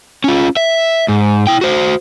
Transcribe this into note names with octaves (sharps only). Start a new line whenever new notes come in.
C#4 F4
E5
G#2
E4 G5
F#4 C5